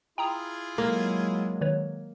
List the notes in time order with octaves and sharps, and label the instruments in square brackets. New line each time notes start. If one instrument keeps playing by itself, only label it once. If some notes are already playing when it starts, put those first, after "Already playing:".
[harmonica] E4 F4 G#4 [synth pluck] G5 A#5 D#6
[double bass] F#3 G#3 [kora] A#3
[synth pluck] D#3 B4 C#5